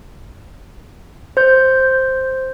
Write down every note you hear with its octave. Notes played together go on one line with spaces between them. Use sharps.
C5 G6